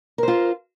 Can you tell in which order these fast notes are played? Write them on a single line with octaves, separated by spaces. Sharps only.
A#4 C5 F4